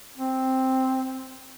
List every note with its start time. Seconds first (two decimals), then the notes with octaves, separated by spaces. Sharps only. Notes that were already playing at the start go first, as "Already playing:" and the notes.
0.18 C4